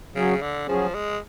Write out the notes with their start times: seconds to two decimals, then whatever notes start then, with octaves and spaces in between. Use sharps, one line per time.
0.15 C#3 F#3 C#4 G#4
0.42 D3
0.68 F3 F#3 C#4 G#4
0.94 G#3